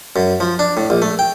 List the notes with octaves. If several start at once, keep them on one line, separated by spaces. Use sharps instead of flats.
F#2
F3
D4
A2
A#1
A3
G5